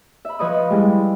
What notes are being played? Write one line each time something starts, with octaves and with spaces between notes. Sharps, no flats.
E5 B5
F3 B4 C#5 D#5 B5 D#6
G3 G#3 E4